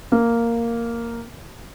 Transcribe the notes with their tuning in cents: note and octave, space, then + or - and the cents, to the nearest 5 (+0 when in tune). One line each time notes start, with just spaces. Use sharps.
A#3 -5